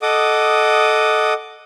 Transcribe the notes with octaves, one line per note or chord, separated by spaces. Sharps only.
A4 D#5 F#5 D6 D#6